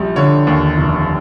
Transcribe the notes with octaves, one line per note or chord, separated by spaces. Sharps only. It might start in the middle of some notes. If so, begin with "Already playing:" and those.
Already playing: A#1 G3
D3 C#5
D#2
F1